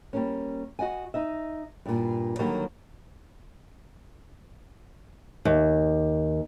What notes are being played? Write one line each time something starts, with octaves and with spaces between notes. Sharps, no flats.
G3 A#3 C#4
F#4 D#5 F#5 G#5
D#4 D#5 E5
G2 A#2
D3 D#3 F#3 G3 A#3 C#5
D#2